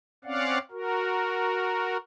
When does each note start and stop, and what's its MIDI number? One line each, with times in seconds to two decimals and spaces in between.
0.25 0.58 60
0.25 0.58 61
0.25 0.58 74
0.25 0.58 77
0.25 0.58 78
0.71 1.97 66
0.71 1.97 70